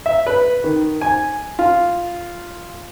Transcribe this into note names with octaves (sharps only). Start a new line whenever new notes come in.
E5
B4
D#3
G#5
F4